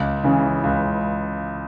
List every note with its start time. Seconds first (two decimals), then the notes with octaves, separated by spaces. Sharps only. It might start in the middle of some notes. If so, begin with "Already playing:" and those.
Already playing: C#2
0.24 C#3 E3
0.64 C#2